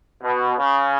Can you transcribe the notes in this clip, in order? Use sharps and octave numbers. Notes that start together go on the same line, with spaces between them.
B2
C#3